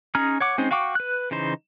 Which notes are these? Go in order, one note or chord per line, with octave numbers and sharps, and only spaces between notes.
C#4 D#4 G#4 A#5 F6
C#5 F#5 D6
G#3 C4 C#4 D#4 C5
F#4 F5 G5 C#6 D6
B4 F#6
C#3 E3 D#4 C5